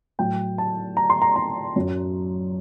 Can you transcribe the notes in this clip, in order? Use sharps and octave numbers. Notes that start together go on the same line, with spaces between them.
A2 F#3 G5
A5
A#5
C6
A#5
A#5
F#2 F#3